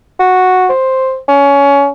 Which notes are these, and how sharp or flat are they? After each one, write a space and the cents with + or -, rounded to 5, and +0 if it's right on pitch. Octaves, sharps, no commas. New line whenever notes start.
F#4 -5
C5 +5
C#4 +20